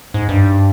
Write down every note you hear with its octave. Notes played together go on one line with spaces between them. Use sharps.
G#2
G2